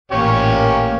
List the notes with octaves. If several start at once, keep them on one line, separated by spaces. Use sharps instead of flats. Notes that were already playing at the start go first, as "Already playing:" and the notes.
A1 A#2 A#3 C#4 G4 C#5